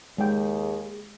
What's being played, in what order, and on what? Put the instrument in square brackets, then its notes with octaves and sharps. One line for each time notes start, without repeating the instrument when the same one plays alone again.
[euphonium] D#2 [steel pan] G#3 G5 [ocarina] G#4